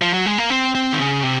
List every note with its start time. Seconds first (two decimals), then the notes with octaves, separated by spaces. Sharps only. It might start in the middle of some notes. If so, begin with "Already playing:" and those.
0.02 F3
0.14 F#3
0.26 G#3
0.38 A#3
0.50 C4
0.75 C4
0.93 D#3
0.99 C#3
1.23 C3